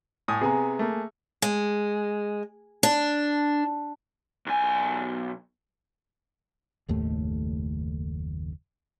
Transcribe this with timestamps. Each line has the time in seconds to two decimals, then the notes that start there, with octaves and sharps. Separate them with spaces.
0.28 A2 G#5 D#6
0.41 C3 B3 G#4 G#5 A#5
0.79 A3 A#3
1.42 G#3
2.83 D4
4.46 B1 G#5
6.88 F#1 D#2 A2 A3